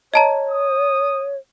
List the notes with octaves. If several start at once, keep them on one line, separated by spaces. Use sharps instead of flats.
C#5 D#5 A5 A#5
D#6